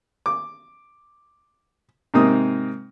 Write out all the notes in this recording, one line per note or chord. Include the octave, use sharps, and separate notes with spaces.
D6
G#2 C3 A#3 C4 D#4 D#6